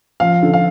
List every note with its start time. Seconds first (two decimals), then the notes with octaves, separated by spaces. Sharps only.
0.20 F3 F5
0.43 D3
0.53 F5